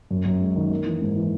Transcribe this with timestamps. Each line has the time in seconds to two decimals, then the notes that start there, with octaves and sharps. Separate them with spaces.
0.11 F#2
0.25 F#2
0.41 G#3
0.56 D#3
0.71 A#3
0.86 E3
1.01 G#2
1.16 E3